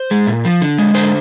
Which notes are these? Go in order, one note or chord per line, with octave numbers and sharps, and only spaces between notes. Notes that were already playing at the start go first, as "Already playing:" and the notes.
Already playing: C5
G#3
A#2
F3
D3
G#3
D3 C5